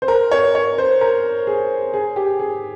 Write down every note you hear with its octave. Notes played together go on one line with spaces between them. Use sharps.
C5
A#4
C#5
C#5
C5
A#4
G#4
G#4
G4
G#4